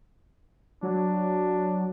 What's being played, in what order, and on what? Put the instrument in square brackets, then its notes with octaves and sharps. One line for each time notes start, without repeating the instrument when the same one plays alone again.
[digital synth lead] F#3 [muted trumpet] D4